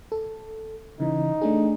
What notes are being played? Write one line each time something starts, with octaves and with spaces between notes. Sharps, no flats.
A4
C#3 E3 D#4
A3 D4 G#4